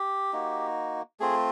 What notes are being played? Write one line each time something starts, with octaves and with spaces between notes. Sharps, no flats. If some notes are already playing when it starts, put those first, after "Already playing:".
Already playing: G4
A#3 D#4 F#4
A3 C4 F4 G#4